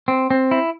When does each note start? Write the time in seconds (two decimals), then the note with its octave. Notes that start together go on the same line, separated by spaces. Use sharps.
0.08 C4
0.30 C4
0.51 E4